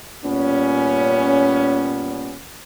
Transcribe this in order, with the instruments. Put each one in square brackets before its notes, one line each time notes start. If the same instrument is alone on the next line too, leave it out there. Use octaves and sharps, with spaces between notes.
[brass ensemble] A#2 G3 B3 C#4